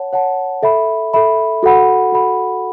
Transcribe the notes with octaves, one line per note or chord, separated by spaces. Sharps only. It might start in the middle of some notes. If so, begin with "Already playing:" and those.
Already playing: C#5 F#5 A5
C#5 F#5 A5
A4 E5 B5
A4 E5 B5
F#4 A4 F#5 B5
F#4 A4 F#5 B5